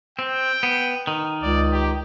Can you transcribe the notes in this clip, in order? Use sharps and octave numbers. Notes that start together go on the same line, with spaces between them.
C4 G5
B3
D#3
C#2 D5
G4